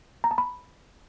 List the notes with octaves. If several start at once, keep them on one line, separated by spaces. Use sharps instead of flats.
A#5
A5
B5